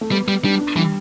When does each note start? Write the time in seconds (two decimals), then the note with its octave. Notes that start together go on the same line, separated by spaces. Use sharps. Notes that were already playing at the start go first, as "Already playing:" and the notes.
0.01 A3
0.12 G3 B3
0.28 G3
0.44 G3 D4
0.61 D4
0.76 E3 G3